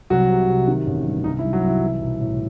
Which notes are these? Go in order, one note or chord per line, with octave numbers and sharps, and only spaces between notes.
C2 F#3 F#4
C3
C3
D#3
A1
G2
C2 D#4
E4
C2
F#3 F#4
C2 E4
E3
B1
A2